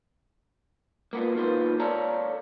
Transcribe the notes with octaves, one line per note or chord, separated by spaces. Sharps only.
A#3 B3 F4
D#3 A#3 B3 F4 B4 C5
A4 C#5 D5 F5 A5 A#5